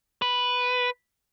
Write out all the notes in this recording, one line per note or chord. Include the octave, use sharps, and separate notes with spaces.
B4